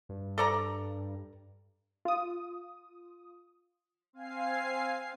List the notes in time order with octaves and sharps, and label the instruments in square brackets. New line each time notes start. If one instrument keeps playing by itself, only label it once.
[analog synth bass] G2
[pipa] A4 D5 A#5
[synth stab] F4 D#6
[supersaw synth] C4 F5 G#5 C7